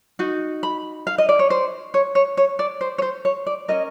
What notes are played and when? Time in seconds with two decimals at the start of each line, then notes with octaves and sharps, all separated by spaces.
0.19 D#4 F#4
0.63 B5
1.07 F5
1.18 D#5
1.29 D5
1.39 C#5
1.50 C5
1.94 C#5
2.15 C#5
2.37 C#5
2.59 D5
2.81 C5
2.98 C#5
3.02 C5
3.25 C#5
3.46 D5
3.68 C#4 F4 A#4 D#5